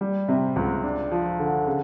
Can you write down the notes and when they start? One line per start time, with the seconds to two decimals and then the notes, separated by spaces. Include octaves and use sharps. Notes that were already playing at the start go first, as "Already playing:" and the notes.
0.01 G3
0.28 C3
0.56 C#2
0.83 D4
1.11 F3
1.39 D3
1.67 C#3